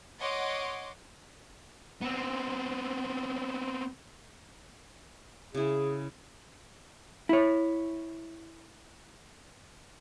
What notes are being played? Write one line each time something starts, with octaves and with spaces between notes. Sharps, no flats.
C#5 D#5 F#5 C6 D6
B3 C4
C#3 E4 G#4
E4 C#5